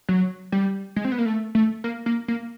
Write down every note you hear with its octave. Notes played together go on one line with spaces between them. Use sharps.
F#3
G3
G#3
C4
B3
A#3
A3
A3
A#3
A#3
A#3